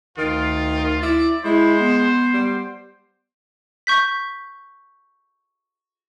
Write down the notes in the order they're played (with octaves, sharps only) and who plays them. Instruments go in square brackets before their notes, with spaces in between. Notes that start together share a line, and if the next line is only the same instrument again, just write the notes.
[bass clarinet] D2 [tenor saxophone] D#3 [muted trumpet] F4
[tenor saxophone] E4 [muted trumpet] D5
[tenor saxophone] G#3 [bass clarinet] E4 [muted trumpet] C5
[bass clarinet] B3
[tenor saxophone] G3
[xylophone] C#6 G6 B6